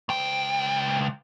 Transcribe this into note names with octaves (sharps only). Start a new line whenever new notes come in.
C#2 G5